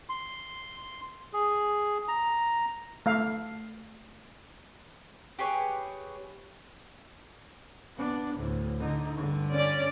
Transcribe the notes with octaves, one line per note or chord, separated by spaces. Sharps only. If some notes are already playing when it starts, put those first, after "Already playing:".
C6
G#4
A#5
A3 F5
G4 G#4 B4 C#5
B3 D4
D2 A2
D3 D#4
G2 D3
C#4 D5